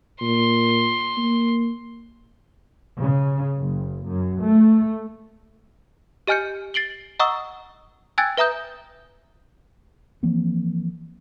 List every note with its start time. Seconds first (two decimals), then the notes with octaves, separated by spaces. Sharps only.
0.21 A#2 C6
1.17 A#3
2.97 C#3
3.59 F#1
4.09 F#2
4.43 A3
6.27 G4 D#5 G#5 F6 G6 C#7
6.74 A6 C7 D7 F#7 G7
7.19 D#5 F#5 A#5 C#6 D#6 E6
8.18 G5 G#5 E6 F#6 G#6 A6
8.37 B4 E5 A#5 D#6 G6
10.23 E3 F3 A#3 C4